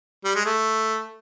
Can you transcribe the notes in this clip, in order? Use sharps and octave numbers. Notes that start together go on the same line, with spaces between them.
G3
G#3
A3